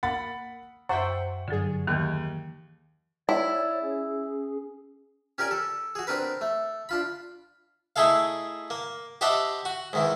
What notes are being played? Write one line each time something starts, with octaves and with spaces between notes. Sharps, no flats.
A#3 F#5 B5 A6
F#2 C5 E5 F#5 G5 C#6
G2 D3 F#3 G#4
D#2 D#3 E3
E4 C#5 D5
C#4 G#4
C#4 G4 A#4 D5 G#5
A4
F#4 G#4
C4 D4 A#4 B4
A3
D4 F4 B5
A3 D#4 E4 G#4 A4 F5
A#3
G4 C5 D#5 E5 F#5 A5
F#4
G#2 D#3 E3